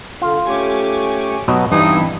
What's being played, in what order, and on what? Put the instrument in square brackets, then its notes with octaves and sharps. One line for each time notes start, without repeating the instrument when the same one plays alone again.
[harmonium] D3 [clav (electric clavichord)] F4
[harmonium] A3 C#4 G4 [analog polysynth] G#5 C#6 D6
[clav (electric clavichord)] B2 F#3 B3 [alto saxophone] D#5
[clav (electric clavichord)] G2 [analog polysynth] E3 C4 E4 [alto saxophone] D#4 [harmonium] E5 A5